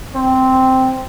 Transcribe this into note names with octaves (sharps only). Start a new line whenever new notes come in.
C4